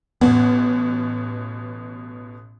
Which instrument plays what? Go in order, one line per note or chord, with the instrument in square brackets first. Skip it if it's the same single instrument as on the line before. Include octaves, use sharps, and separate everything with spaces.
[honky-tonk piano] A1 B2 [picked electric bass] B3